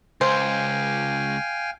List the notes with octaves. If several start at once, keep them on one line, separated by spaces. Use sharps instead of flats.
C#2 C5 F5 G5 G#5